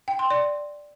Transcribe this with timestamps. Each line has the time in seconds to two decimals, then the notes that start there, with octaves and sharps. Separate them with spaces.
0.08 G5
0.19 C6
0.30 D5